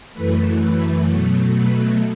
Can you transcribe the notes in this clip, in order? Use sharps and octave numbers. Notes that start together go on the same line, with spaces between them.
F#2 E3 A3 B4
B4
B2 F#3 A3
B4